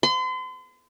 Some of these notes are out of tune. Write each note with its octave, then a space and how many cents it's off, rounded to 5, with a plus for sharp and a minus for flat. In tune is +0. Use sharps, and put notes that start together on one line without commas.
C6 -40